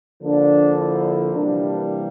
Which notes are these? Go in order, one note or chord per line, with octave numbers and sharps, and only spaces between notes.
D3 F3 A#3 D4
E4
C3 E3 G3 A#3 D4